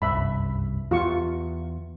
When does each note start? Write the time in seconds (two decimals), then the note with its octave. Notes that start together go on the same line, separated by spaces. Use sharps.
0.02 F#1 C2 G2 E5 B5
0.91 E2 F4 G4 C#6